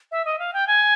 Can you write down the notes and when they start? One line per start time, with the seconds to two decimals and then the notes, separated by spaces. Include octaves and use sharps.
0.11 E5
0.25 D#5
0.39 F5
0.53 G5
0.67 G#5